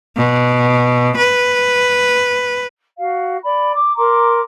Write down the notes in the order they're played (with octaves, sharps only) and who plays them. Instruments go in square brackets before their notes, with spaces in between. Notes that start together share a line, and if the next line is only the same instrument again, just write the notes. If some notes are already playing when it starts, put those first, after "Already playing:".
[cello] B2
B4
[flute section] F#4 F5
D5 B5
D6
A#4 A#5 C6 D6